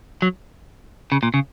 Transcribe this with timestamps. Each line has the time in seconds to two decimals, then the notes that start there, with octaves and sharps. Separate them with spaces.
0.22 F#3
1.12 C#3
1.23 A#2
1.34 C#3